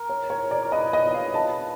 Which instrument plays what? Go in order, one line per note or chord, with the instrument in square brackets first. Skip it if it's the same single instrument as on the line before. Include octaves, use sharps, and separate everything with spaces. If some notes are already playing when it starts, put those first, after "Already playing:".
Already playing: [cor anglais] A#4
[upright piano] C#5
C#5
D5
[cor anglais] A#4
[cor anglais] B4 [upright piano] D#5
[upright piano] D#5
F5
A5